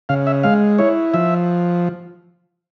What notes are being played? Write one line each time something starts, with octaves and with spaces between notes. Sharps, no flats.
C#3 F5
E5
G#3 F5
E4 C#5
F3 E5